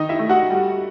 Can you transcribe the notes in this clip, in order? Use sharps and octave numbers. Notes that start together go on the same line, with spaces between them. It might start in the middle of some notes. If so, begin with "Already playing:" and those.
Already playing: D#3 D#4 D#5
E4 E5
A3
F#4 F#5
G3